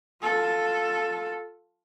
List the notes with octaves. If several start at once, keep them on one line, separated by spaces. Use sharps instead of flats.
F4 A4